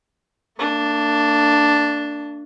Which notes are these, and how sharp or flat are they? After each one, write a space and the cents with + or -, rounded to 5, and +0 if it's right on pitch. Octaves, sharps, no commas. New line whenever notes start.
A#3 -45 D4 +0